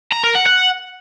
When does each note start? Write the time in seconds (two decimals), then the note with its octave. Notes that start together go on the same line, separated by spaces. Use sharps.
0.12 A#5
0.24 A#4
0.35 F#5
0.47 F#5